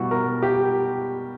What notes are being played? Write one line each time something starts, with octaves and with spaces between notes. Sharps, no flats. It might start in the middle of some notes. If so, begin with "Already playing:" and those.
Already playing: B2 G3 B3 E4 F#4
A#4
G4